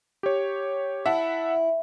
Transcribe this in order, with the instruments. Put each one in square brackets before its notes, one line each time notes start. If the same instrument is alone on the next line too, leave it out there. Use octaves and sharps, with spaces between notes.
[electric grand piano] G4 C#5
[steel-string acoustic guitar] E4 [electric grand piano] E5 F#5 A5